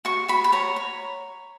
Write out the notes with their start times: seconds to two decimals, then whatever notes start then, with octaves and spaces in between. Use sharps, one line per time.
0.05 F#4 C#6
0.28 F#4 B5
0.44 B5
0.52 C#5 A#5
0.76 C#5